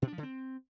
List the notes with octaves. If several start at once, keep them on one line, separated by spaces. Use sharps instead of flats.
B2
D4
F3
D3
C4